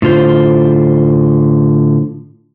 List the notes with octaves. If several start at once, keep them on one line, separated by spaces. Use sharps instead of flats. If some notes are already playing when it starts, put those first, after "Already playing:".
A2 D3 F4 C5